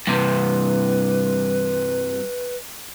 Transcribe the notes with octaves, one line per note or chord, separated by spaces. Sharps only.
G2 C3 B4